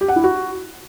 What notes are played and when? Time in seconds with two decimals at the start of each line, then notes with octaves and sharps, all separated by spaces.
0.01 G4
0.08 F#5
0.16 E4
0.24 F#4